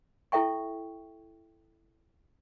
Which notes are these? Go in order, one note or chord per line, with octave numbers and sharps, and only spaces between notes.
E4 A4 E5 G5 C#6